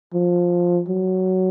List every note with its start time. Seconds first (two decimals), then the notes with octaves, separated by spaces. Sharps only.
0.14 F3
0.88 F#3